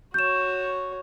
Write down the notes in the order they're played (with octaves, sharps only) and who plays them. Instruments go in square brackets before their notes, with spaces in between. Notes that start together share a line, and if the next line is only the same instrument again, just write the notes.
[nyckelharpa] F#4 C#5 [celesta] G6 E7